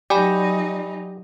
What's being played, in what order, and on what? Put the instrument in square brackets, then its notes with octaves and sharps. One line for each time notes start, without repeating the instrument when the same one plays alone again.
[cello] F#3 D#4 [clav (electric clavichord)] G4 [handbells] D5 G#5 B5